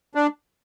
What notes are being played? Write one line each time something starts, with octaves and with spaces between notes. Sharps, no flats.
D4